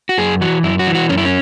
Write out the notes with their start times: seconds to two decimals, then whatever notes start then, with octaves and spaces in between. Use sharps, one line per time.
0.09 F#4
0.18 F#2 G#4
0.41 E3 F#4
0.64 F#2 E4
0.79 F#4
0.87 E3
0.95 F#4
1.09 F#2 C#4
1.17 E4
1.25 C#4